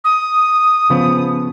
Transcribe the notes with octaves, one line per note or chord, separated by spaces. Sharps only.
D#6
C#3 F3 B3